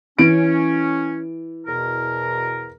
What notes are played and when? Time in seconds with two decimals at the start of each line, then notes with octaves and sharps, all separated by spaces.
0.19 E3 C#4 D7
1.67 E2 B2 A#4